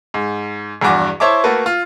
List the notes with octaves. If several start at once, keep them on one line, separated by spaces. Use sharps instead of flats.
G#2
A#1 E2 G2 F#4 D6
E4 C5 C#5 E5 A5 D6
A3 A#3 F#4 A4 B4
F4